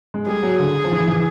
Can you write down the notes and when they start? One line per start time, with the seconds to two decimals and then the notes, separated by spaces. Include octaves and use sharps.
0.14 G#3
0.27 G3 G#4
0.43 F#3
0.59 D3
0.84 F3
0.92 E3
1.08 E3